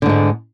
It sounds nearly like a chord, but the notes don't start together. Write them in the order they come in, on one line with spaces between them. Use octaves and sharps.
D3 G#2 G#3